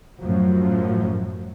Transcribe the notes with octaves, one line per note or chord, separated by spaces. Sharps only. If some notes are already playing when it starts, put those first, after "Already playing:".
F#2 A2 F3 F#3